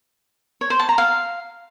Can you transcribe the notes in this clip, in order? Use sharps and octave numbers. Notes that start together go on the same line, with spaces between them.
C#5
C5
A5
A#5
F5